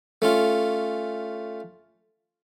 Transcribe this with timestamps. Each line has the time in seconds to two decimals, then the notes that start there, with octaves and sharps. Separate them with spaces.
0.22 A3 C#4 F4